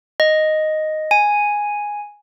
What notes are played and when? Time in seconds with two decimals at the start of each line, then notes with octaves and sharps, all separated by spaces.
0.20 D#5
1.11 G#5